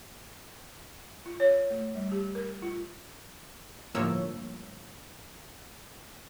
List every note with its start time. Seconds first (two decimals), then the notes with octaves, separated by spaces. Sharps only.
1.26 F4
1.40 C#5
1.70 A3
1.95 G3
2.12 G4
2.35 A#4
2.62 F4
3.95 G1 A2 F3 A#3 C#5 E6